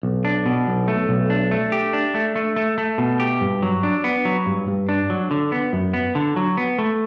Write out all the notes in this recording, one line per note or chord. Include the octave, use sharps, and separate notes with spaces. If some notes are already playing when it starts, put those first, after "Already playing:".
B1
D4
B2
B1
A3
B1
D4
A3
G4
D4
A3
A3
A3
A3
B2
G4
G2
F#3
D4
B3
F#3
G2
G2
D4
F#3
D3
B3
F#2
B3
D3
F#3
B3
A3